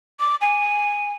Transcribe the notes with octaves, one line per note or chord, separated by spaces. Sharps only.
D6
G#5